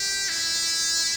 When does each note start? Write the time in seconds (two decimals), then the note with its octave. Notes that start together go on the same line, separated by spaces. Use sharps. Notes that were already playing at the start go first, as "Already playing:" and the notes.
Already playing: G4
0.29 E4